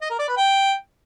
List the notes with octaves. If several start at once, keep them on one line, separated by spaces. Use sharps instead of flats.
D#5
A#4
D5
B4
G5